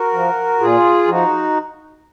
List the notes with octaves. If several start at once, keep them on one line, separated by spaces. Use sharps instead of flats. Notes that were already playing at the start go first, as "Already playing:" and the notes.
Already playing: F#4 A#4
F3
A#2 F4 G#4
F3 D#4 F#4